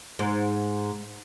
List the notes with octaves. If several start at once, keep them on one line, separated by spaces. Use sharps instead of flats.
G#2